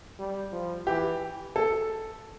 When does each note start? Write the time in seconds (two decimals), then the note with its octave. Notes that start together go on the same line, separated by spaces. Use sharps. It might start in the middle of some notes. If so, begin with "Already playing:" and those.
0.19 G3
0.52 F3
0.87 E3 G4
1.56 A4